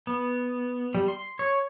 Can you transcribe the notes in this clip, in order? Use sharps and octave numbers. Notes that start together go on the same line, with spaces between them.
B3
G3
C6
C#5